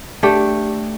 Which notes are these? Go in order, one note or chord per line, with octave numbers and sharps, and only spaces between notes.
A3 D4 G4